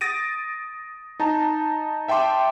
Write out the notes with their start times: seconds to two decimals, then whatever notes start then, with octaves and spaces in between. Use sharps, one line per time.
0.01 D#6 A6 A#6 D7 D#7
1.20 D#4 A5 A#5
2.08 E5 G5 A5 C6 D6